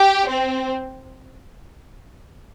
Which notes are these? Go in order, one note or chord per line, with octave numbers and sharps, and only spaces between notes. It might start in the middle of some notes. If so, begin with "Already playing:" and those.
Already playing: G4
C4